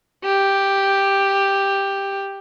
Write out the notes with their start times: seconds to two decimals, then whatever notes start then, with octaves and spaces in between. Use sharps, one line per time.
0.25 G4